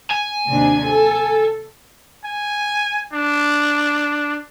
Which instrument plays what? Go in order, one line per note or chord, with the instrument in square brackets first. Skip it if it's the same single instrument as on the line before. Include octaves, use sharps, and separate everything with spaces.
[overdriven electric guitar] G#5
[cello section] D#2 C3 D4
A4
[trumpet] G#5
D4